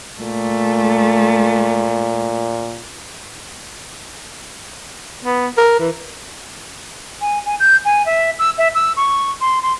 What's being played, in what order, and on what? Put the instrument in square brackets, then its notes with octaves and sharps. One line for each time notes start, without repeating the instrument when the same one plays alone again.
[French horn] A#2 [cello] A3
[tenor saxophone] B3
A#4
E3
[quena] G#5
G#5
G6
G#5
E5
E6
E5
E6
C#6
C6
C6